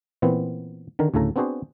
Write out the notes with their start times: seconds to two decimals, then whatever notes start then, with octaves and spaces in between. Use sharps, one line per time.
0.22 A#2 E3 B3 C4
0.99 D3 D#3 A#4
1.14 D2 A2 C#3 A4 A#5
1.36 B3 C4 D4 F#4 G#4 C5